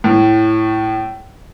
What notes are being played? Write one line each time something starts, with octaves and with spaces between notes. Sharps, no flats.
A2